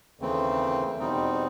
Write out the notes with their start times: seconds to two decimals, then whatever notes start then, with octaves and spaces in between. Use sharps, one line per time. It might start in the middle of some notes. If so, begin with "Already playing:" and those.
0.20 D#2 C#3 E3 A3 C4
0.99 E2 B2 G3 C4 D#4